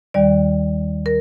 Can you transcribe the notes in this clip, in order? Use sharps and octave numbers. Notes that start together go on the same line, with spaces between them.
D#2 D#3 G3 D5
A#4